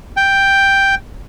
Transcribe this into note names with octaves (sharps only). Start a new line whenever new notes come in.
G5